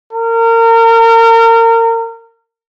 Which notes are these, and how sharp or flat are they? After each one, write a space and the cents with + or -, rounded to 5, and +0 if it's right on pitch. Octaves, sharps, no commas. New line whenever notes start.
A#4 -30